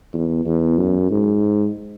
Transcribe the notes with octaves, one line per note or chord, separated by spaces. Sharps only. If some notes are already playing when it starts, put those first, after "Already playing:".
E2
E2
F#2
G#2